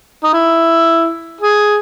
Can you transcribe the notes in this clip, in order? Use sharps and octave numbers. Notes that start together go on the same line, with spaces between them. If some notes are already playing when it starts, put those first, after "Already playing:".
D#4
E4
G#4